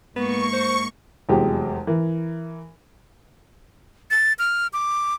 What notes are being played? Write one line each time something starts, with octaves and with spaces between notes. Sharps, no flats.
G#2 A#3 B3 C#6
C5
F1 E2 F#3 G#3 G4
E3 A#4
A6
F6
D6